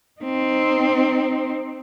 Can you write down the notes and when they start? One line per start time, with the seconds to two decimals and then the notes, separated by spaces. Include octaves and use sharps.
0.21 C4 D#4